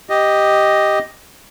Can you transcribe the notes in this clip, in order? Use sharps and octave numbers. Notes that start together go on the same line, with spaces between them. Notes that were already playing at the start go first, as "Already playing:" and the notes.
G4 D#5